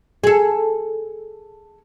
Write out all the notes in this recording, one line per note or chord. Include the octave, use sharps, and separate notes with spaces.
G#4 A4